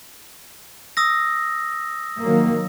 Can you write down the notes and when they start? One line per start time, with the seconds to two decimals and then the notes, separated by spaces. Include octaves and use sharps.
0.97 D#6 E6 A#6
2.22 D#3 F#3 A#3